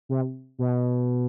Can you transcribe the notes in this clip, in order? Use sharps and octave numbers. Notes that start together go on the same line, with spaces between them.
C3
B2